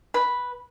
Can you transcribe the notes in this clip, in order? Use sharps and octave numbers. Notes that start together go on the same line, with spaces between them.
B4